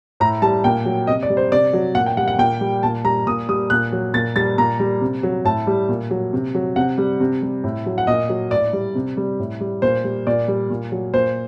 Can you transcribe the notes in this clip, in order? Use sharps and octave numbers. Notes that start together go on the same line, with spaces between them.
A2 A#5
G3 A5
A#2 G5
F#3
C3 D#5
D5
G3
C5
C3 D5
F#3
A#2 F#5
G5
G3 F#5
F#5
A#2 G5
G3
A#2 A5
G3 A#5
A#2 D#6
G3 D#6
A#2 F#6
F#3
A#2 A6
G3 A6
A#2 A#5
G3
C3
F#3
A2 A5
G3
A#2
F#3
C3
F#3
C3 F#5
G3
C3
G3
A2
F#3
F#5
A#2 D#5
F#3
A2 D5
G3
C3
G3
A2
G3
A#2 C5
G3
A#2 D5
G3
A#2
F#3
A#2 C5